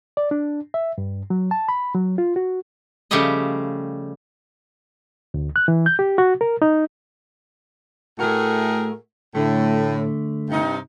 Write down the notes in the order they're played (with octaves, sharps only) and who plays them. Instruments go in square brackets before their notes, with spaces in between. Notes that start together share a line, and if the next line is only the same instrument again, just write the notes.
[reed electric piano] D5
D4
E5
G2
F#3
A5
B5
F#3
F4
F#4
[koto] C#3 F3 G3 A3 G4 D#5
[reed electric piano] D2
F#6
E3
G6
G4
F#4
A#4
D#4
[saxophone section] A2 G#4 A#4 [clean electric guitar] A3 F#4
[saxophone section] A2 [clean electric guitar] D3 A3
[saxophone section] G2 C3 D#4